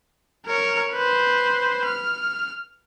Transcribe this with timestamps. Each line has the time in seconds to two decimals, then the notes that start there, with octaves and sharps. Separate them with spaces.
0.46 A#4 C#5
0.92 B4 C5
1.85 F6